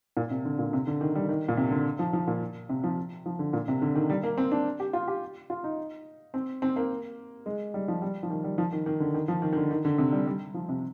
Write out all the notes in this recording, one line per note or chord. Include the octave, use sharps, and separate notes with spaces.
A#2
C3
D3
A#2
C3
D3
D#3
G3
D#3
A#2
C3
D3
F3
F3
A#2
C3
F3
F3
D3
A#2
C3
D3
D#3
G3
A#3
C4
D4
G4
F4
G4
F4
D#4
C4
C4
A#3
G#3
G3
F3
G3
F3
D#3
G3
F3
D#3
D#3
D3
D#3
F3
D#3
D#3
D3
D#3
D3
C3
G3
G3
F3
C3